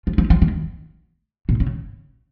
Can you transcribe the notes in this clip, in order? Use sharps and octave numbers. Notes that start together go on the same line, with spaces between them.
F3
F3
F3
D#3
A#2
C#3